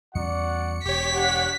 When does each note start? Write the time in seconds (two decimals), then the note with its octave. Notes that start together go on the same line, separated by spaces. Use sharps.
0.15 E2 G3 C#4 F#4 D5 F#5 C#7
0.85 E1 G4 C#5 B6
1.16 D4 F#5